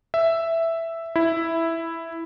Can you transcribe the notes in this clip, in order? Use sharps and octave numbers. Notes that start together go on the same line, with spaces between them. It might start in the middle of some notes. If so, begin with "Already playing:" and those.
E5
E4